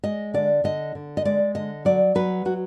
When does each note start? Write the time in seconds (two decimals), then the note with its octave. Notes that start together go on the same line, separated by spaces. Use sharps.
0.04 G#3 D#5
0.34 D3 D5
0.64 D3 D#5
0.95 D3
1.17 D#5
1.25 G#3 D5
1.55 D3 D#5
1.85 F#3 D5
2.15 F#3 B4
2.45 F#3 F#4